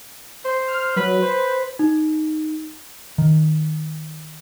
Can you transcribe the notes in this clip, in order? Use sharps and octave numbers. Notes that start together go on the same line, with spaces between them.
C5
F6
F#3 B4
C5
D#4
D#3